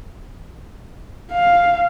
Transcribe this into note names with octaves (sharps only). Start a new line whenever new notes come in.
F5